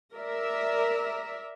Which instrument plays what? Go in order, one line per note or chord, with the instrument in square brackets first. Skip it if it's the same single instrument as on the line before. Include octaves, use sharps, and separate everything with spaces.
[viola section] A#4 D5 E5